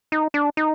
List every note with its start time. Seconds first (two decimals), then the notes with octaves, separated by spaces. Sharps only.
0.12 D#4
0.34 D4
0.57 D#4